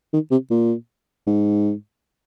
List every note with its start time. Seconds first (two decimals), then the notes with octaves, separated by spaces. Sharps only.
0.13 D#3
0.31 C3
0.50 A#2
1.27 G#2